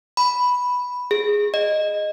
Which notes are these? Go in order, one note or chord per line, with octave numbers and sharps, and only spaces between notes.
B5
G#4
D#5